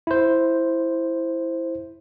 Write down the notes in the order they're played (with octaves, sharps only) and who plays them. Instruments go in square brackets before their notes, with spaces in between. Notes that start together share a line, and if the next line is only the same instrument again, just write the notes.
[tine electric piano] E4 C5